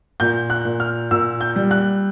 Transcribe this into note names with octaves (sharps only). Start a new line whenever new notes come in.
A#2 G6
F#6
A#2
F6
A#2 E6
G6
G3
F#6